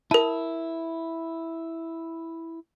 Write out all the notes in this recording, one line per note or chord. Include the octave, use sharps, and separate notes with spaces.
E4 A#4 A5